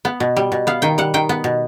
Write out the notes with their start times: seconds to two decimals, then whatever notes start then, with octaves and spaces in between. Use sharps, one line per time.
0.05 B3
0.20 B2
0.36 G3
0.52 B2
0.67 B3 F5
0.82 D#3 G5
0.98 G3 F#5
1.14 D#3 G5
1.29 B3
1.44 B2